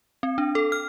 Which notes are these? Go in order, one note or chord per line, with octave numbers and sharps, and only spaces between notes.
C4
D4
A4
F6